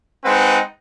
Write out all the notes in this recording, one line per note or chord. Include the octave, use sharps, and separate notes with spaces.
G#3 C4 D#4 B4 F#5